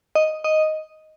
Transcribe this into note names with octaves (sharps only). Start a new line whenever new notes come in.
D#5
D#5